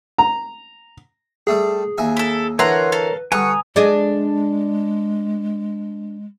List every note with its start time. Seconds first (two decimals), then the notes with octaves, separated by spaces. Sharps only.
0.18 A#5
1.47 G3 A3 G4 G#4
1.98 D#2 E5 G#5
2.17 E4 A4
2.59 D3 E3 A#4 B4 C#5 F#5 A#5 C6
2.92 A4 F5
3.32 D3 G3 B4 F#5 G#5 A#5 C#6 D#6
3.76 G#3 D4 G#4 D#5